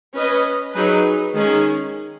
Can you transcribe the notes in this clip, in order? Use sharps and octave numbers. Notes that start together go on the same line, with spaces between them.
C#4 B4 D#5
F#3 D#4 G#4 B4
D#3 G#3 C#4 G#4